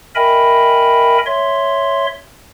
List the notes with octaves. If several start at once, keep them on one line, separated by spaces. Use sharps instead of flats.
A#4 D#5 E5 G5 G#5 B5
C#5 E5 C6